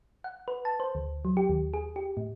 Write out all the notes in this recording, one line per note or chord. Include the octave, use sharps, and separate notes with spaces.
F#5
B4
A5
C5
D2
F#3
G4
D#2
G#4
G4
A2